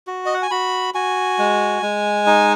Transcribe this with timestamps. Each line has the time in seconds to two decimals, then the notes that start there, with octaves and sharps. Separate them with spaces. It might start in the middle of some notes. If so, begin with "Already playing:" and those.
0.07 F#4
0.26 D#5
0.34 F#5
0.42 G#5
0.51 F#4 B5
0.94 F#4 G#5
1.38 G#3
1.82 G#3
2.26 D#4